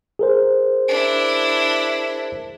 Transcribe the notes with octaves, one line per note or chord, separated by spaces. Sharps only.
G#4 A#4 C5
D4 E4